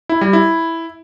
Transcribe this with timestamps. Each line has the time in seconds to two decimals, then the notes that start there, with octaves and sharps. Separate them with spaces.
0.09 E4
0.21 G3
0.33 E4